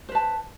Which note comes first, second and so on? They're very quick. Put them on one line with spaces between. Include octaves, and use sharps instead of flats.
C5 B4 A5